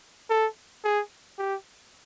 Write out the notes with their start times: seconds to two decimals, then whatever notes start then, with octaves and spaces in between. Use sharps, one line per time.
0.30 A4
0.84 G#4
1.38 G4